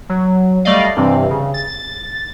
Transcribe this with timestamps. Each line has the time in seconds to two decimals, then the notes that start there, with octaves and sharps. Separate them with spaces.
0.09 F#3
0.65 G3 A3 D5 D#5 F5
0.96 G2 C3 E3 G3 C4
1.31 C#3
1.54 A6